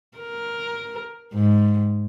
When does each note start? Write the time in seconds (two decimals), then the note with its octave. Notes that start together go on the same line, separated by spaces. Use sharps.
0.18 A#4
1.34 G#2